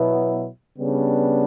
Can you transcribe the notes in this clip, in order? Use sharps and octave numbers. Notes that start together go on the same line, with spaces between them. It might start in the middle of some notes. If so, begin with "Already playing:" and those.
Already playing: B2 F#3 B3 E4
C#3 G3 B3 D4